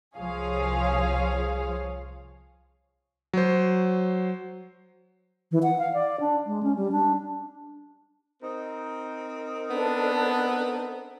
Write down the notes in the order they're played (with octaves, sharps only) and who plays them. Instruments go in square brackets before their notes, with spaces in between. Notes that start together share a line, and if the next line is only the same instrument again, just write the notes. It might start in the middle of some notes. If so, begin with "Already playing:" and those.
[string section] C2 F3 G#4 C#5 F5
[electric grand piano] F#3 C5
[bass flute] E3
F#5
F5
D5
D4
G#3
C#4
G3
D4
[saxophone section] C4 D#4 A#4
[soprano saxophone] B3 [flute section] D4 A4